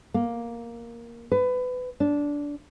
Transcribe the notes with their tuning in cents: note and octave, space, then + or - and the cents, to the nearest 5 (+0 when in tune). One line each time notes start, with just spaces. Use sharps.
A#3 +5
B4 +25
D4 -15